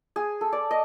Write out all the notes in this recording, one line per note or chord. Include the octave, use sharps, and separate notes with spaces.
G#4
A4
D5
D#5